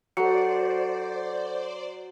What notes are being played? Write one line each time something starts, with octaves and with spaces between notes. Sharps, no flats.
F#3 A4 C5 D5 F#5 C#7